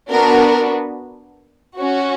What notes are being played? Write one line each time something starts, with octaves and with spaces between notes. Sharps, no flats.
B3 D4 F#4 A#4
C#4 F#4